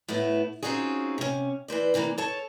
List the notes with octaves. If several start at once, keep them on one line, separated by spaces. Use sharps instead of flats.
A2 A3 B3 E4
C4 C#4 D#4 F4 F#4 G#4
C3 C#4
E3 B4 C5 D5
C3 E3 G#3 A#3
A4 C#5 A5